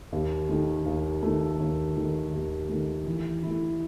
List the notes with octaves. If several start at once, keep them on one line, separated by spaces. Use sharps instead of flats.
D#2
D#3 A3
D#2
D#3 A3
D#2
D#3 A3
D#2
D#3 A3
E3
A3 E4